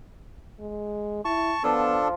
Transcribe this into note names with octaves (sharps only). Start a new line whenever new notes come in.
G#3
E4 A5 C#6
F3 B3 D4 A4